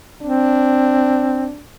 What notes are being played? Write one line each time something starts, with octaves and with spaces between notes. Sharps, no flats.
C4 D4